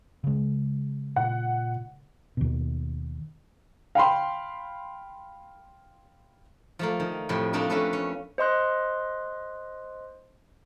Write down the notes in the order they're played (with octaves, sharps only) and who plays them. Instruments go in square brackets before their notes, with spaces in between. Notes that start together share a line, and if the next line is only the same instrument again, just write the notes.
[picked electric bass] C#3 G#3
[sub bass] A#2 [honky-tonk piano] F#5
[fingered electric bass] D#2 B2
[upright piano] F5 G5 B5 C6
[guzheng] F3 A3 A#3
D#3
F2 A2 C3 G5
A3 A#3 C4 D4 D#4 F4
A3 A#3 C#4 D4 A4 B4
C#4
[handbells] C5 D#5 C6 F#6